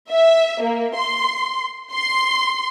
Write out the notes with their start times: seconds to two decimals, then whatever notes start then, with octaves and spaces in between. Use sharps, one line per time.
0.11 E5
0.62 A#3
0.95 C6
1.93 C6